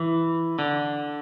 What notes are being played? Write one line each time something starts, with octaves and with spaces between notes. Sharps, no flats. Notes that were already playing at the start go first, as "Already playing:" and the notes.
Already playing: E3
D3